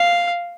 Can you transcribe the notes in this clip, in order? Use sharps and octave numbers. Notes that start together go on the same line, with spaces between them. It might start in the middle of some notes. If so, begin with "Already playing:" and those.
Already playing: F5